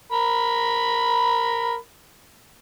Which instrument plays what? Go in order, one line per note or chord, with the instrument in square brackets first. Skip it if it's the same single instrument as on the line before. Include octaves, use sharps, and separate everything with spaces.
[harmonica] A#4 B5